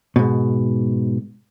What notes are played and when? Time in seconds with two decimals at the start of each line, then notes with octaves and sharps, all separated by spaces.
0.16 G#2 B2